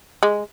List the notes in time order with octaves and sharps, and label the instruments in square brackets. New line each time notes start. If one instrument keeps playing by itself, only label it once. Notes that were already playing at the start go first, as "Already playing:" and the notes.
[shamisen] G#3